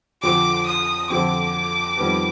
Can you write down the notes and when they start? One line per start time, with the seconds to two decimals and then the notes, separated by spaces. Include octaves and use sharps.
0.23 F2 D3 F3 C4 D6
0.67 D#6
1.10 F2 D3 F3 C4 D6
1.98 F2 D#3 G3 B3